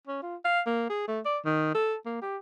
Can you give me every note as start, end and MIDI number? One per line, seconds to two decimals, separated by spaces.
0.07 0.21 61
0.22 0.36 65
0.45 0.61 77
0.66 0.88 58
0.90 1.04 68
1.08 1.20 57
1.25 1.38 74
1.45 1.74 51
1.75 1.96 69
2.06 2.21 58
2.22 2.37 67